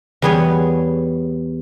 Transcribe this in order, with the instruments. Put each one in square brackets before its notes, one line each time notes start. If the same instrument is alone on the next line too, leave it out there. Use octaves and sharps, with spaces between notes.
[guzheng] E2 G3 B3 G#4 C#5